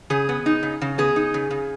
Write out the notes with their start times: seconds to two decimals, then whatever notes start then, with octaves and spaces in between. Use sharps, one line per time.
0.10 C#3 G#4
0.29 B3
0.46 D#4
0.63 C#3
0.81 C#3
0.98 B3 G#4
1.16 D#4
1.34 C#3
1.51 C#3